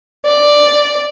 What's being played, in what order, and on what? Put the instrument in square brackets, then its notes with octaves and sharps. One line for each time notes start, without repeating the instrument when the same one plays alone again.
[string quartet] D5